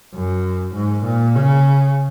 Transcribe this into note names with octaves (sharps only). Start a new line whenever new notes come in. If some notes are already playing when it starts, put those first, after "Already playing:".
F#2
G#2
A#2
C#3